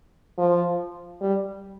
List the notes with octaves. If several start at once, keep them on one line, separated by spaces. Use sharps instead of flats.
F3
G3